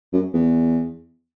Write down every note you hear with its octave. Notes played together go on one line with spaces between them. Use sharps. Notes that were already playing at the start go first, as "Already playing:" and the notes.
F#2
E2